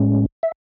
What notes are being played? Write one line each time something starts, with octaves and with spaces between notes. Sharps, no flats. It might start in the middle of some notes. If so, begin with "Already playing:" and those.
Already playing: A2 G#3 C#4
E5